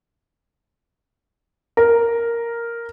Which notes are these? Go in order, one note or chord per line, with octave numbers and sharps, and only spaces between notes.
A#4